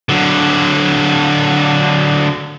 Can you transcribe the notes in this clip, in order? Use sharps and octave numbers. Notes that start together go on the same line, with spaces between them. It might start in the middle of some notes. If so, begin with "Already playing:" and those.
D3 F#3